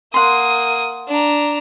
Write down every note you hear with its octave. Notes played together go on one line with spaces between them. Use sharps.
A#3 F#5 C6 D#6
D4 A#5